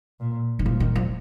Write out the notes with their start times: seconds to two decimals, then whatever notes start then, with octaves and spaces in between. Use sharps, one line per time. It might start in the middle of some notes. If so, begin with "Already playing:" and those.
0.20 A#2
0.59 D#3
0.65 A#2 F3
0.80 D#3
0.96 F3